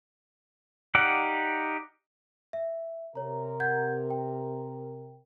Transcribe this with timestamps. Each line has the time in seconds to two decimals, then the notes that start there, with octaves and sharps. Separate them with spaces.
0.95 D#4 G4 D5 F5 F#5
2.53 E5
3.15 C3 A#4 C#5 A#5
3.60 F#5 G6 G#6
4.10 G5